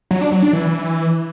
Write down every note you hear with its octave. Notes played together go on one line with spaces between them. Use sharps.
F#3
D4
F#3
D4
E3